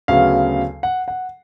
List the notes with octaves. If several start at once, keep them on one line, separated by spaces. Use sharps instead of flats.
D2 C#3 F#3 B3 F5
F#5
F#5